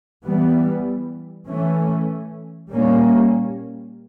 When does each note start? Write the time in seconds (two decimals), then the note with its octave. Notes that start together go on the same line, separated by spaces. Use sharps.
0.23 E3 G3 B3
1.47 E3 A3 C#4
2.69 A#2 G3 A#3 C#4